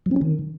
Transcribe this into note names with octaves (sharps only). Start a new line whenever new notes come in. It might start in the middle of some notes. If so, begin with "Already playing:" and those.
F#3
C4
C#4
D#3